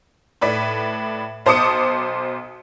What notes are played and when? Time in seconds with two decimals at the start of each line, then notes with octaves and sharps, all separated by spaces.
0.41 A2 B4 D5 B6
1.46 B1 C5 A5 D6 D#6 C#7